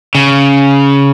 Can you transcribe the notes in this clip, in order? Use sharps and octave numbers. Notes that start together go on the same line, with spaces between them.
C#3